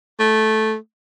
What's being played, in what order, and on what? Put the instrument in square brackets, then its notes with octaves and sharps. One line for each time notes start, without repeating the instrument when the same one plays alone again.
[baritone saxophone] A3